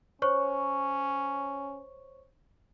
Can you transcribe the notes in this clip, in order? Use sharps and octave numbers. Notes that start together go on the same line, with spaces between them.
C#4 C5 C#5 C#6